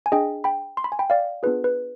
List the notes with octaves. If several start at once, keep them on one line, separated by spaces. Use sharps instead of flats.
G#5
D4 G#4 D#5 G5
G5 B5
C6
B5
G#5
G5 B5
D5 F5
B3 D4 F4 G#4 B4
B4